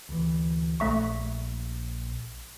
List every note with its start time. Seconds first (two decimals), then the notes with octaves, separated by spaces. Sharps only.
0.09 D2 E3
0.80 A#1 A3 E5 C#6